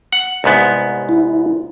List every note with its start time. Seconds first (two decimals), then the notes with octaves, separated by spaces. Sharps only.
0.13 F#5
0.44 C2 G#2 B3
1.09 E4